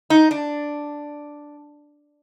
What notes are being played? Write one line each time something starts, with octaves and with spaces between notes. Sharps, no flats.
D#4
D4